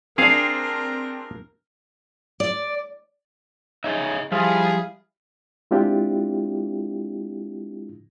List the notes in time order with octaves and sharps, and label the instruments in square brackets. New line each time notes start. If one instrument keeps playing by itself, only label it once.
[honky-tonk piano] C4 D4 [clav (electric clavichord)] G#4 F5 [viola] A#4
[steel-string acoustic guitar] D5
[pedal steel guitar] D#4 [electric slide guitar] G#4 C#5 E5
[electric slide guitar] F3 [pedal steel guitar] G3 E4 F5 [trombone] G#4
[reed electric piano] G#3 C4 D4 E4 F4 G4